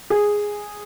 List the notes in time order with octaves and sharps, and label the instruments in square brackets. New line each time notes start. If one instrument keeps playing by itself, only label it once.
[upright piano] G#4